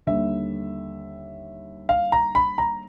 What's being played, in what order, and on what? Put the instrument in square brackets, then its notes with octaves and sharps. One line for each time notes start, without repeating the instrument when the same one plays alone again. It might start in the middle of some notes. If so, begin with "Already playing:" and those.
[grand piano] D#2 D3 G3 E5
F5
A#5
B5
A#5